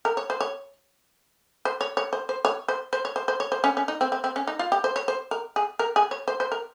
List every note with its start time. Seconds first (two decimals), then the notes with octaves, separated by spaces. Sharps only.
0.05 A#4
0.17 C#5
0.30 C5
0.41 C#5
1.65 C5
1.81 C#5
1.97 C#5
2.13 C5
2.29 C5
2.45 C#5
2.68 C5
2.93 C5
3.05 C#5
3.16 C5
3.28 C5
3.40 C#5
3.52 C5
3.64 C#4
3.77 C#4
3.88 D#4
4.01 C4
4.12 C4
4.24 C4
4.36 C#4
4.47 D#4
4.59 F4
4.72 G4
4.84 C5
4.96 C#5
5.08 C5
5.31 A#4
5.56 G#4
5.79 A#4
5.96 G#4
6.11 C#5
6.28 C5
6.40 C5
6.52 A#4